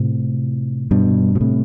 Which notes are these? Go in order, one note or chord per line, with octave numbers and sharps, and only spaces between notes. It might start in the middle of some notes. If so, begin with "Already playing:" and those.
Already playing: A2 C3
G2 B2
B2
A2 C3